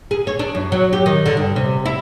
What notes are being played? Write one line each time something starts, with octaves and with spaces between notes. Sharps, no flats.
G#4
C#5
D4
F#2
F#3
G4
D#3
D3
G2
C3
E4